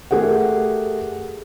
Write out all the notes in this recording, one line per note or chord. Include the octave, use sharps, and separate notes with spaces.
A3 G4 G#4 A#4 F#5